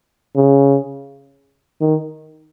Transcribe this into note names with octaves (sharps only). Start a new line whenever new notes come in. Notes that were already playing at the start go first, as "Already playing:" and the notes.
C#3
D#3